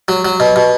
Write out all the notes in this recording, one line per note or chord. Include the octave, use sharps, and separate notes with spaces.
F#3
F#3
B2
B2